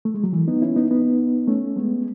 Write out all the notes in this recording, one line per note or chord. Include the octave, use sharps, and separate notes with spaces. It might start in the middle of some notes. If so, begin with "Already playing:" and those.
A3
G#3
F#3
E3
B3 D#4
C#4 E4
B3 D#4
B3 D#4
A3 C#4
G#3 B3